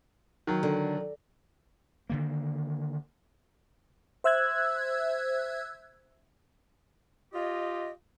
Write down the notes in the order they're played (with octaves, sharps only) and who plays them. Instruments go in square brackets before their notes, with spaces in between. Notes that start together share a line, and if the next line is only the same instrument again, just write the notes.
[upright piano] D#3 F#3
[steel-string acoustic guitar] D3
[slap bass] D3 D#3 A#3
[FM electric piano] C5 E5 E6 F#6 G#6
[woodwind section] F4 G4 D#5